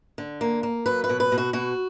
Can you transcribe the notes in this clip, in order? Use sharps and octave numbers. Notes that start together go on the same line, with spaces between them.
D3
A#3
A#3
F#3 B4
B4
B2
B4
B2
F#4
B2 F#4